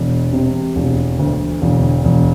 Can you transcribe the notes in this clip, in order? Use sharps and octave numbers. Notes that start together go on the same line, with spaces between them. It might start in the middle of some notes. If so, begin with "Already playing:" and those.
Already playing: E1
C3
E1
D2
E1
E1